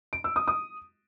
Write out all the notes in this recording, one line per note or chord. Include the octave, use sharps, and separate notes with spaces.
D7
E6
D#6
D#6